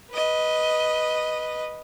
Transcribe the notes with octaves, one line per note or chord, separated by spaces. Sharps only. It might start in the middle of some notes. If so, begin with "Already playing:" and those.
B4 D#5